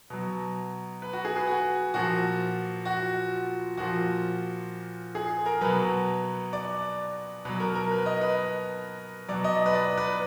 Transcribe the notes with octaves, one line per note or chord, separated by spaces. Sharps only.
B2 F#3
B4
F#4
G#4
B4
F#4
A#2 F3 F#4
F#4
A#2 F3 F#4
G#4
A#4
B2 F#3 B4
D5
B2 F#3 B4
A#4
A#4
B4
D#5
B4
B2 F#3 D5
D#5
B4
D5
B4